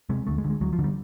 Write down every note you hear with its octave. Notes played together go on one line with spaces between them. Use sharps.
C3 G#3
D2 A3
G#3
D3
G#3
D2 F#3
F3
D3
G3